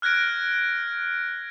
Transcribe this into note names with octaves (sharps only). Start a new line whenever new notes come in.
F6 F#6 G#6 A#6 D7